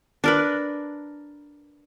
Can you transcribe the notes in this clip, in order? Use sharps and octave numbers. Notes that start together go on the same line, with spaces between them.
D4 A#4 B4